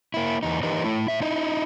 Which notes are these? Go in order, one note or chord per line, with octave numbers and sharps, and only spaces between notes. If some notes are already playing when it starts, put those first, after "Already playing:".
A#3 E4
E2 D#4
E3 D#4 G4 A#4 B4 D#5
A3 E4
A2 E5
D#4 E4 D#5